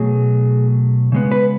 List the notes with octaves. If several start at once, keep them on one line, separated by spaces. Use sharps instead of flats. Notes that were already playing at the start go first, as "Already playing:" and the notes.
Already playing: B2 F#3 A3 G#4
C#3 G#3 B3
B4